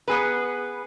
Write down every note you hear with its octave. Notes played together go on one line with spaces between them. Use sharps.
B3 G#4 B4